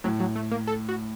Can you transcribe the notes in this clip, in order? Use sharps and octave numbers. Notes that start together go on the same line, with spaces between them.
A2 F#3
F#3
A3
A#3
A4
F#4